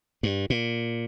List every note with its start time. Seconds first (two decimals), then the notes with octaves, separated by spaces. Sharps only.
0.23 G2
0.50 A#2